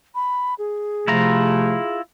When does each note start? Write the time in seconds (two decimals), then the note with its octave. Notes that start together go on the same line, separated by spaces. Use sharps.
0.15 B5
0.59 G#4
1.08 C3 F3 A3 E4 F4 A#5